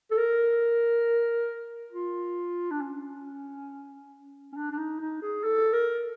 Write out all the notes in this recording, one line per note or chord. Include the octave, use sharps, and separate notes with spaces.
A4
A#4
F4
D4
C#4
C#4
D4
D4
D#4
D#4
G#4
A4
A#4